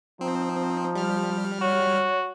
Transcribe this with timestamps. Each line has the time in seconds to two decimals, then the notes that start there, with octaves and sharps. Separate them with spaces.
0.21 F3 C4 D#4
0.95 G3 F6
1.62 F#4 C#5